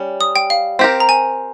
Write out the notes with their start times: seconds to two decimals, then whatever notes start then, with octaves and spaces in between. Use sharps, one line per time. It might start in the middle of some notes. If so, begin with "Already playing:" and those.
Already playing: G3 C#4
0.21 D#6
0.36 G5
0.50 F5
0.79 C4 G4 A#4
1.00 A#5
1.09 G#5